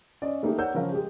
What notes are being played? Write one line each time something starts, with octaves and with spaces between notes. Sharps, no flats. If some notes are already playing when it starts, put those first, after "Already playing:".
C#4 D5 D#5
A3 A#3 D#4 G4 G#4
A#4 C#5 D5 F#5 E6 G6
C#3 F3 C#4 A#4 F5
G#3 G4